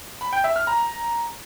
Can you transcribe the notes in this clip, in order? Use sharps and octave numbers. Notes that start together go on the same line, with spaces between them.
B5
G5
E5
F6
A#5